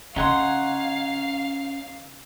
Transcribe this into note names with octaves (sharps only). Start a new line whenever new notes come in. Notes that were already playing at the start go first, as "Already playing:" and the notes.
C#3 C#4 D#4 F5 F#5 G#5 C6